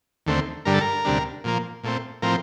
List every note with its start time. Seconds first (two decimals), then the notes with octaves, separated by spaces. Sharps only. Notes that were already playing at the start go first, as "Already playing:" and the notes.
0.26 D#2 D3 A3 C4
0.65 G2 D3 G3 A#4
0.74 A4
0.81 A#4
1.05 D2 C3 G3 D4
1.44 A#2 F3 A#3
1.84 A#2 A3 C4
2.22 A2 F3 C4 A#4